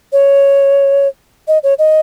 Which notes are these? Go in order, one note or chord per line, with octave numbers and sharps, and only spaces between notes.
C#5
D#5
C#5
D#5